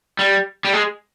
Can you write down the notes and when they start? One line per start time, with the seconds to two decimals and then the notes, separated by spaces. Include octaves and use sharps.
0.19 G3
0.65 G3
0.73 G#3